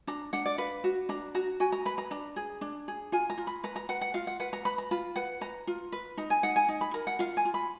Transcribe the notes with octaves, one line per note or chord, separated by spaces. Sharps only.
D4 A#5
D4 F#5
D5
B4 F5
F#4
D4 A#5
F#4 A#5
F#4 G#5
A#5
B4 B5
A#5
D4 A#5
G#4
D4
G#4
F4 G#5
A#5
F4
B5
B4 A#5
A#5
B4 F#5
F#5
F4 F5
F#5
B4 F#5
A#5
B4 B5
A#5
F4 B5
B4 F#5
B4 A#5
F4
B4
D#4 A#5
G#5
D#4 F#5
G#5
D#4
B5
A#4 A#5
F#5
F4 F5
G#5
F4
B5